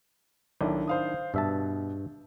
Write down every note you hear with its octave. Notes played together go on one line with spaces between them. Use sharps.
B1 D#3 D4 E4
C5 F5 D#6
G2 B2 E5 A5